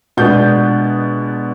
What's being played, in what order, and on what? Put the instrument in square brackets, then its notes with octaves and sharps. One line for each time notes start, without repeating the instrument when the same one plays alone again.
[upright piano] B2 G#3 B3 D4 G6